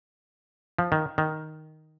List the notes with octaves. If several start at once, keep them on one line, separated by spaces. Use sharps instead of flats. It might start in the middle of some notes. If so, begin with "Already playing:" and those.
F3
D#3
D#3